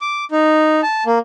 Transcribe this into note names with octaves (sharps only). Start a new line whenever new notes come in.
D6
D#4
A5
A#3